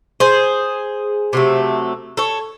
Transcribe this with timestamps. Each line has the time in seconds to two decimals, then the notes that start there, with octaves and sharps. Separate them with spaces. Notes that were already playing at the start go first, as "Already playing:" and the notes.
0.20 G#4 C5
1.33 C3 F#3 A3
2.17 A4 C#5